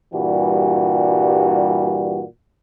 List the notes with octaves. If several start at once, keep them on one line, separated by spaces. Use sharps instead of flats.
G2 A#2 E3 G3 F#4